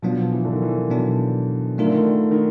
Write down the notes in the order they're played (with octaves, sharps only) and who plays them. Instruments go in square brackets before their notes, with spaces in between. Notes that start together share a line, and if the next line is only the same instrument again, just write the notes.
[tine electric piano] B2 F#3 B3 D4 [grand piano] F3
[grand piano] E3
D3
D#3
E3
[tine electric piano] B2 F#3 B3 D4
[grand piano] D#3 [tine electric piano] A3 D4 F4 A#4
[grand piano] D3
D#3
D#3
D#3